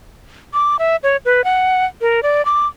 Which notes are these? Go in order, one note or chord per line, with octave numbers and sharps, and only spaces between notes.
D6
E5
C#5
B4
F#5
A#4
D5
D6